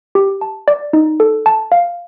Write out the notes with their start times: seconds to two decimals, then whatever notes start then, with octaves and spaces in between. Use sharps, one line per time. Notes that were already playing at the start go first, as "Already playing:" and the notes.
0.15 G4
0.41 A5
0.68 D5
0.93 D#4
1.20 A4
1.46 A5
1.72 F5